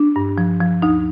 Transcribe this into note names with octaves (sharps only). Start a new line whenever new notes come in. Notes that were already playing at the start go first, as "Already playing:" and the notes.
Already playing: D4
G2
F3
F3
D2 D#4